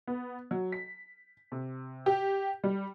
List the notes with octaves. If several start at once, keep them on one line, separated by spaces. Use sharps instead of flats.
B3
F#3
B6
C3
G4
G3